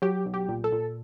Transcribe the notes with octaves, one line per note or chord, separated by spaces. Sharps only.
F#3 G4
B1
G4
A#2
A4
A#2